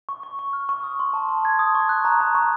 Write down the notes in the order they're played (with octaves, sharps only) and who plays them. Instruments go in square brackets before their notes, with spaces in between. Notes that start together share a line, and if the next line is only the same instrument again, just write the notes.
[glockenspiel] C#6
C#6
C#6
F6
C#6
D#6
C6
A5
C6
G#6
D#6
C#6
F#6
A#5
A#5
C#6